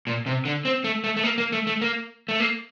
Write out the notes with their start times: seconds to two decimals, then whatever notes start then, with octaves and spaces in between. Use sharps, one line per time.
0.07 A#2
0.26 C3
0.45 D3
0.65 C4
0.84 A3
1.04 A3
1.17 A3
1.23 A#3
1.38 A#3
1.52 A3
1.67 A3
1.81 A#3
2.28 A3
2.40 A#3